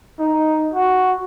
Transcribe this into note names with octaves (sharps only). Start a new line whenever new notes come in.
D#4
F#4